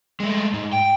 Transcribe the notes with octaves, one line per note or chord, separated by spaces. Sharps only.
G#3 A3
G#2
G5